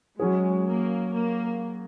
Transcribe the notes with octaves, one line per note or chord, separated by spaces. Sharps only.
F#3 G#3 C#4 G#4
A#3
A#3